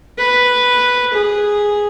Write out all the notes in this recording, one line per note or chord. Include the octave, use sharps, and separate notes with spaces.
B4
G#4